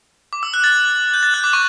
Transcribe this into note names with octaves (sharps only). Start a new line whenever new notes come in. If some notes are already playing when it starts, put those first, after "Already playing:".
D6
E6
F#6
A6
G6
A6
F#6
D6
C#6